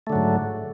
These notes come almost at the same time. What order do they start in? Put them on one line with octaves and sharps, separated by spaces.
A3 D3 F#3 G#2